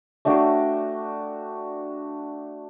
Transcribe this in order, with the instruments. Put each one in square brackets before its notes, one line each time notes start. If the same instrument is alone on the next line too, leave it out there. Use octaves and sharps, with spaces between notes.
[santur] A3 D4 F#4 G5